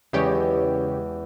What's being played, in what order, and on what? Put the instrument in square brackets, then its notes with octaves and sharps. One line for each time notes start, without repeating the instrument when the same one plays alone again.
[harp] E2 G#3 [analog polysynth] C#3 G4 C#5